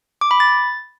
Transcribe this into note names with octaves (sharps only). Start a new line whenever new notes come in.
D6
B5
A6